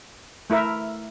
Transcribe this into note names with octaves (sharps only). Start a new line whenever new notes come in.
A3 E4 A#4 E5